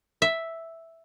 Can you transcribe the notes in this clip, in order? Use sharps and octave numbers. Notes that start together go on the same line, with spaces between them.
E5